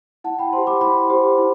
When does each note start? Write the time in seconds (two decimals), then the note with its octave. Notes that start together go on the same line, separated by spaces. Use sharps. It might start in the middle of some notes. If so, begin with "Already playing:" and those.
0.24 E4 F#5 A5
0.38 G5 B5
0.53 C5 A5 C6
0.56 G4
0.67 B5 D6
0.81 E4 B5 D6
1.10 G4 C5
1.38 E4